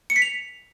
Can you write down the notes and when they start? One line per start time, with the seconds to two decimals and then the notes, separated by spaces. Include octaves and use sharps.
0.10 C#7
0.16 B6
0.22 F7